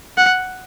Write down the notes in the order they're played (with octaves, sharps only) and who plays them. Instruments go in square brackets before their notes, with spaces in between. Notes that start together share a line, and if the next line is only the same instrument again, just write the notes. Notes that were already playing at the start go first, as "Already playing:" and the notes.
[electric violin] F#5